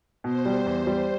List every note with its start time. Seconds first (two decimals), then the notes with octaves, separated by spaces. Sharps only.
0.24 B2 C5
0.46 G3
0.66 E2
0.87 G3